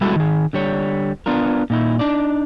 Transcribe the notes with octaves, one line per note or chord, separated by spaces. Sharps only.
G3 G#3 B3 E4 F#4 A4
D#3 G#4
D3 G3 C#5
B3 D4 F4 A#4
A#2 D#4 E4
D4 D#4 D5